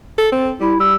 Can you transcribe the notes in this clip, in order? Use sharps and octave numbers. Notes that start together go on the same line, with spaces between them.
A4
C4
G3 E4
G3 E6